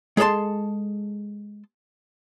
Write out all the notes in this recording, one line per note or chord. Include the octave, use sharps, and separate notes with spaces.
G#3 G#4 A4 C#5 A5 C6